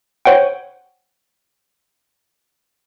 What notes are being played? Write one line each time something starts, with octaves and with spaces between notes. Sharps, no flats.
C5 C#5 F#5 G5